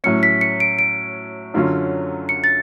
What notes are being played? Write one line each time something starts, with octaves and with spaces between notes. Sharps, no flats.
A2 F#3 C#4 C#7
B6
C#7
D7
D7
F#2 D3 F#3 C#4 F4
C#7
A6